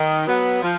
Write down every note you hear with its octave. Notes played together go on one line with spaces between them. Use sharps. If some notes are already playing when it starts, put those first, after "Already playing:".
Already playing: D#3
F#3 B3
F3